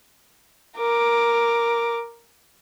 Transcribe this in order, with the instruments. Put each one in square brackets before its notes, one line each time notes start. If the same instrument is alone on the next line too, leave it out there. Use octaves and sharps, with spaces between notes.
[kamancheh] A#4 D6